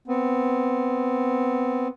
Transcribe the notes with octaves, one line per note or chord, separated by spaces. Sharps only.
B3 C4